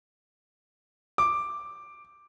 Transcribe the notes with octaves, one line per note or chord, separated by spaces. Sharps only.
D6